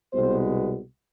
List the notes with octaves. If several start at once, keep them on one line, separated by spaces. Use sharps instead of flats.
C2 B2 G#3 B3 C5